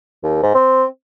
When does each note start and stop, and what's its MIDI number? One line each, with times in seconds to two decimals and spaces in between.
0.23 0.39 39
0.43 0.53 44
0.55 0.85 60